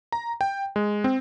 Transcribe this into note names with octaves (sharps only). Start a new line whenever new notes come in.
A#5
G5
G#3
C4